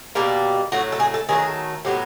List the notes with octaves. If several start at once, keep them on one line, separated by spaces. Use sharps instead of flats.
B2 G3 A#3
A2 F#3 A3 F#4
A4
G#4
A4
D#3 F#3 A3 G#4
A2 F#3 B3 G4